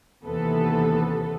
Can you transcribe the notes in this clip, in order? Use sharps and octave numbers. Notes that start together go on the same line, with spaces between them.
D#2 C3 E3 B3 A4 B4